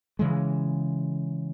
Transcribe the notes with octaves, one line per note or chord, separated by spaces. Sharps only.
C#3 E3 G#3